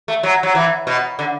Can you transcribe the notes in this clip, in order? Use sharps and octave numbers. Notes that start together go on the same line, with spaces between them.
A3
F#3
F#3
E3
B2
D3